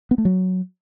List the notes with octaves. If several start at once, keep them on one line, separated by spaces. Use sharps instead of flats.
B3
A3
F#3